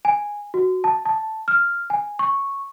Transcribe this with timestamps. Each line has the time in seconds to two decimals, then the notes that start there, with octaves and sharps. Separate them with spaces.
0.05 G#5
0.54 F#4
0.84 A5
1.06 A5
1.48 F6
1.90 G#5
2.19 C#6